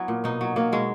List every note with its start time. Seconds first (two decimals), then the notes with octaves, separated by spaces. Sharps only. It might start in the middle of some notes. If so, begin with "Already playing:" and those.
Already playing: F#3 B3 E4
0.08 A#2
0.24 B2 D#4
0.41 F#3
0.56 F#3 A#3
0.72 B2 G#3